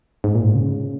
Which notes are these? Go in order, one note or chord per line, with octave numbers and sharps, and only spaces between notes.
G#2
A#2
G#2
C#3